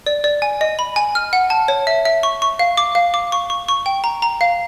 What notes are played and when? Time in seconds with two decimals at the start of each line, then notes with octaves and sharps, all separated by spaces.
0.07 D5
0.24 D5
0.42 G#5
0.61 D#5
0.79 B5
0.96 G#5
1.15 F6
1.33 F#5
1.50 A5
1.68 C#5
1.87 E5
2.05 E5
2.23 C#6
2.42 C#6
2.59 F5
2.77 D6
2.95 F5
3.14 D6
3.32 C#6
3.50 C#6
3.69 C#6
3.86 G5
4.04 A#5
4.22 A#5
4.41 F5